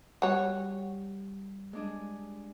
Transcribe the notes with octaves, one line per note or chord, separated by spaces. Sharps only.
G3 F#4 C#5
G#3 D4 G#4